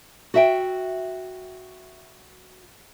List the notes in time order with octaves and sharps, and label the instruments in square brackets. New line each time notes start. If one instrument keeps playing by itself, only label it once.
[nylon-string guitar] F#4 E5 G5